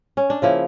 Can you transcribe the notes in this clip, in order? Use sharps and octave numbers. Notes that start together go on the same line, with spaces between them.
C#4
D4
C#3 F3 A#3 E4